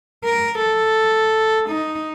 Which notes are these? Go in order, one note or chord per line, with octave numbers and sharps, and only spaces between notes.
A#4
A4
D#4